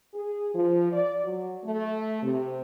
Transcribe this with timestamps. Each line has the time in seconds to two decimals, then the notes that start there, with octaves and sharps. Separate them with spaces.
0.14 G#4
0.54 F3
0.92 D5
1.24 F#3
1.63 A3
2.22 C3